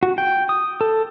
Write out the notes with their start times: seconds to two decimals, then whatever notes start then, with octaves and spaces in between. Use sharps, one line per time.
0.03 F#4
0.18 G5
0.49 D#6
0.81 A4